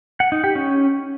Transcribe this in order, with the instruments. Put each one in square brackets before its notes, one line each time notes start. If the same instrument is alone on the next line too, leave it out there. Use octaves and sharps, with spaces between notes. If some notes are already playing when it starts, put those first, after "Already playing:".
[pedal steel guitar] F#5
D#4
G4
C#4